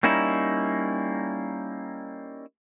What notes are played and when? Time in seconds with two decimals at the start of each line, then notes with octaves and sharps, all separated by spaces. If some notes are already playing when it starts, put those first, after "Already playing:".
0.03 G3 A#3 C#4 D#4 E4